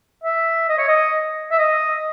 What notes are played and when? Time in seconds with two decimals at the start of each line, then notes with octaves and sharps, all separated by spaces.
0.24 E5
0.69 D#5
0.78 C#5
0.88 D#5
1.52 E5
1.59 D#5